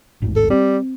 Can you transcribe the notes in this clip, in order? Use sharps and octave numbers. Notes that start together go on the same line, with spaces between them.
D#1 A1 G#2
A4
G3 C4